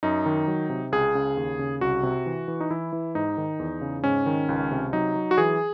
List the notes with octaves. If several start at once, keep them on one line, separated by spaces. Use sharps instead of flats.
F#2 D#4
D#3
F#3
C3
C#2 G#4
C#3
D#2
C#3
C2 F#4
C3
E3
E3
D#4
E3 E4
E3
G#2 D#4
D#3
E2
C#3
G#2 C#4
D#3
C#2
C3
F#3 D#4
F#3
F#4
E3 G#4